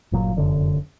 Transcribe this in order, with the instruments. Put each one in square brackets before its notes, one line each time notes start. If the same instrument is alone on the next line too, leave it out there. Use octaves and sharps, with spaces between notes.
[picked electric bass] G1 A#2 F#3
F1 F#2 D3